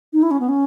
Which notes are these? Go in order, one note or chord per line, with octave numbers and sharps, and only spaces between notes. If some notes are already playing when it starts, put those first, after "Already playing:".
D#4
E4
C#4
B3
C#4